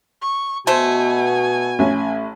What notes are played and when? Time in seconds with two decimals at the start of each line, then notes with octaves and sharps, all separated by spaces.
0.22 C#6
0.67 B2 A3 F#4 C5 G#5
1.79 A1 C#4